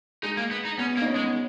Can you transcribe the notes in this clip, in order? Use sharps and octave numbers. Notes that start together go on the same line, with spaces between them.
G#3 D#4
A#3
B3
D#4
B3 C#4
A#3
D#4
C#4
G#3
B3